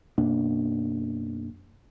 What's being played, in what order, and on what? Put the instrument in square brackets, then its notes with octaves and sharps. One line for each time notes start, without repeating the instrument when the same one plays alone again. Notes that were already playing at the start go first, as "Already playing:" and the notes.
[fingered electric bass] F#2 B2 A#3 D4